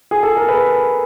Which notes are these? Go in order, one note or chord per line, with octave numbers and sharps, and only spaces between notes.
G#4
A4
A#4
B4